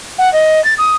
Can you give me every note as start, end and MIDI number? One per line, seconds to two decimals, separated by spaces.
0.18 0.31 78
0.33 0.62 75
0.64 0.74 93
0.78 0.96 87